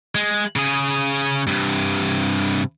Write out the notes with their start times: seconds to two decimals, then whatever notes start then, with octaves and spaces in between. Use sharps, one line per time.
0.15 G#3
0.56 C#3 G#4
1.47 G2 C3